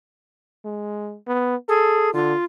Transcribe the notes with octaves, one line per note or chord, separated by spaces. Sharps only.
G#3
B3
G#4 A4
D3 F4